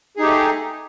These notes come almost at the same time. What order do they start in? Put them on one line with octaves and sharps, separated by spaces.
G#4 D#4 G4 A3